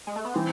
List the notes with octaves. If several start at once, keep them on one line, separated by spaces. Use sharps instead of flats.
G#3
A3
B3
E3 C4